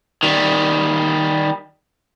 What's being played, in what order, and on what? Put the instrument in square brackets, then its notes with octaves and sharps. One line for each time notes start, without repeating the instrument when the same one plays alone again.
[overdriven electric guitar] D#3 G3